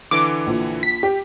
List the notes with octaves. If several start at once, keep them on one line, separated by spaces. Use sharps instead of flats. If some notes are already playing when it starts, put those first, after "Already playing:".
D3 E3 D6
A#1
B6
G4 G5